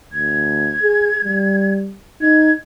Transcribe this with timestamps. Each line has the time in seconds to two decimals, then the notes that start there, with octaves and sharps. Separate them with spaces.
0.13 D2 G#6
0.82 G#4
1.24 G3
2.21 D#4 G#6